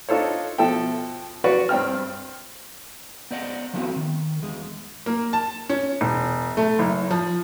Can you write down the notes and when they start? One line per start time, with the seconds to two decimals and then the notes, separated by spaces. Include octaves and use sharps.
0.09 D4 D#4 F4 A4 C5 C#5
0.58 B2 F3 A4 E5 G5
1.44 F#4 B4 D5 C#6
1.69 G2 C4 G5 F6
3.31 B3 C5 D5 D#5 F#5
3.74 F3 A3 B3 C4 F#4
3.96 D#3
4.42 E2 G#3
5.06 A#3
5.33 A5
5.69 C#4
6.01 E1
6.57 A3
6.79 F#1
7.11 F3